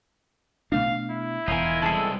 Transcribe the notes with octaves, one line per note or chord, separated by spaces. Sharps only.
B2 A3 D4 F5
E4
E1 E2 D#4 F4 A#4 G#5
C2 G#3 G#4 A4